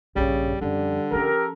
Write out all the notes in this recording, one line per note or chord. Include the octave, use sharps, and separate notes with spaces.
A#1 G2 C#3 G3
F#2 D3 F3 G3
F3 C#4 G4 A4 A#4